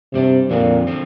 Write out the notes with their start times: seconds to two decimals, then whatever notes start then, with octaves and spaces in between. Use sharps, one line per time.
0.13 G2 C3 G3 D4
0.50 F2 A#2 D3 F3 C4
0.87 D3 F3 C4